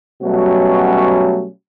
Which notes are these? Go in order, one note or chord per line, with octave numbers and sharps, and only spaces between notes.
B2 F#3 G3 A3 C#4 F#4